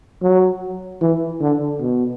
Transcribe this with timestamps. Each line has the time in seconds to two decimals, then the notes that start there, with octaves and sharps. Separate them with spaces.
0.22 F#3
1.01 E3
1.41 D3
1.80 B2